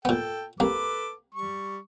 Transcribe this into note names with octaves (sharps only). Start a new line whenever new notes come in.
A#2 B3 A4 G5
C2 A#3 A4 B4 D6
G3 C#6